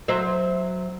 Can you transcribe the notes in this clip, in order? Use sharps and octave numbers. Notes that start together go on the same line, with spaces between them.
F#3 C5 E5